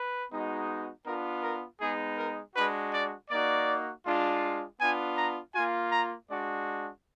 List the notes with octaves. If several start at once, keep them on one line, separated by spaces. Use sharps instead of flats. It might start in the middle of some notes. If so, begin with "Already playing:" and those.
Already playing: B4
G#3 B3 D#4 F#4
B3 D4 F4 A#4
A#4
G#3 B3 D#4 G#4
A#4
G#3 D4 F#4 B4
D5
A#3 D#4 F#4 D5
G#3 D4 F4
B3 D4 F4 G#5
A#5
A#3 F4 G#5
A#5
G#3 D4 F#4 D5